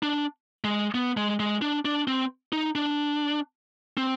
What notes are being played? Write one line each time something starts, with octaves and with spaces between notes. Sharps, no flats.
D4
G#3
B3
G#3
G#3
D4
D4
C4
D#4
D4
C4